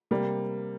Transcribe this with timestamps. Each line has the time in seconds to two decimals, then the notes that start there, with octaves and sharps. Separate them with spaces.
0.11 C3 G3 A#3